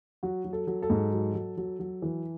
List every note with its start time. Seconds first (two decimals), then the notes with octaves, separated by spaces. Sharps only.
0.23 F#3 F#4
0.45 F#3
0.53 A4
0.67 F#3
0.82 A4
0.90 G#2
1.13 F#3
1.34 F#3
1.57 F#3
1.79 F#3
2.02 E3